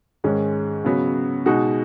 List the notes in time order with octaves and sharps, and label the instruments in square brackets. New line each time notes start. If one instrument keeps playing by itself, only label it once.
[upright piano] G#2 D#3 G#3 C#4
C#3 F#3 B3
B2 G#3 D#4 F#4